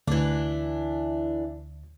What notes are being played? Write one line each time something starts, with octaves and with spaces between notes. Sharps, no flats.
D2 E3 D4